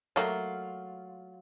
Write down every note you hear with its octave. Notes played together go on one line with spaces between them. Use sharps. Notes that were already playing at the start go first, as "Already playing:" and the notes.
F#3 A3 A#3 F4 C#5